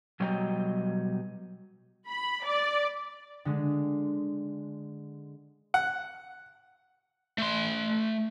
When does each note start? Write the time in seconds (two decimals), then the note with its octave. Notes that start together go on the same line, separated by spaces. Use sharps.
0.20 B2 F#3 G3 D#5 G5 A#5
2.08 B5
2.44 D5
3.45 D3 G#3
5.74 F#5
7.38 A3 C6